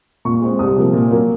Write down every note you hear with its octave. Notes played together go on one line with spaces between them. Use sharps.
A#2 C#6
G#3 C4
C2 D#6
C3 F3 A#3
A#2
F#3 A#3